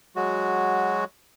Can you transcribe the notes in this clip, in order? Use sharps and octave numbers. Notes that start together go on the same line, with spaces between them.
F#3 G#3 F#4